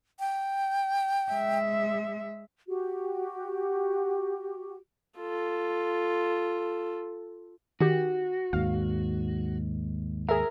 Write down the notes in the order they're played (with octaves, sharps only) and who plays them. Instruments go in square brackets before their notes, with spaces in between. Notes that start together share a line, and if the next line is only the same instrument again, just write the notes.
[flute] G5
[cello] G#3 E5
[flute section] F#4 G4
[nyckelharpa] F4 A4
[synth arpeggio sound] D#3 G4 [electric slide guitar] F#4
[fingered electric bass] D#2 G#2 [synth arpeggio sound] F5
[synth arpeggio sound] G#4 E5 [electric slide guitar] A#4